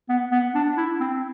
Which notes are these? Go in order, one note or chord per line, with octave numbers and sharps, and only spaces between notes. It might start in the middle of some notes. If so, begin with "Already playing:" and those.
B3
B3
D4
E4
C4